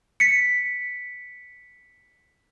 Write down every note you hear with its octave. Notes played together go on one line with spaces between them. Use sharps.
B6 C#7